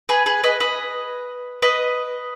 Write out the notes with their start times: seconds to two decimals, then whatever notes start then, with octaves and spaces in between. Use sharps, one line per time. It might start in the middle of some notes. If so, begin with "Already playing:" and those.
0.09 G#4 B4
0.26 G#4 B4
0.44 B4 D#5
0.60 B4 D#5
1.62 B4 D#5